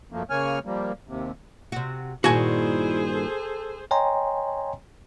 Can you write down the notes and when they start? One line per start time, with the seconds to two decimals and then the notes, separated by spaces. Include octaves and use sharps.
0.12 F#2 F3 A3 A#3
0.30 C#3 A#3 C#5 G#5 F6
0.65 F3 G3 A#3
1.07 D#2 C3
1.72 C3 F#4
2.24 G2 A#2 D#3 E4 F#4 G#4 C5 G#5
3.14 A4
3.91 C#5 D#5 G5 G#5 A#5 C6